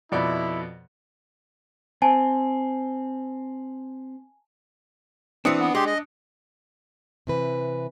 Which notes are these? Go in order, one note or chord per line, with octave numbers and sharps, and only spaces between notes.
F2 B2 E4 D5
C4 G#5 A5
E3 C4 D4 D#6 C#7
B3
G#3 G4 C6
D#5
C3 E3 B4